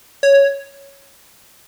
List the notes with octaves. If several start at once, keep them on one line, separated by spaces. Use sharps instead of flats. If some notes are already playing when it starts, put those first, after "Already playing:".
C#5